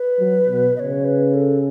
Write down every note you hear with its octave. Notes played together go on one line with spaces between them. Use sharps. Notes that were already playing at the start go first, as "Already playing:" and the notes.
Already playing: B4
F#3
B2
C#3 C#5 D#5
B4
A4